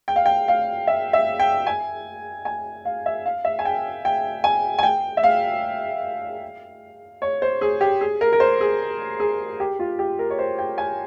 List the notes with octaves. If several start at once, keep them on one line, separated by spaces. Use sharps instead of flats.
G5
F5
G5
F5
E5
E5
G5
G#5
G#5
F5
E5
F5
E5
G#5
G5
G5
G#5
G#5
G5
E5
F5
C#5
C5
G#4
G4
G#4
A#4
A#4
C5
G#4
G#4
G4
F4
G4
A#4
C#5
C5
G5
G#5